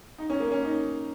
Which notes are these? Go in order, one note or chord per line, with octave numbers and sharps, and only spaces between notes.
D#4
C#4
A#3
C#4
D#4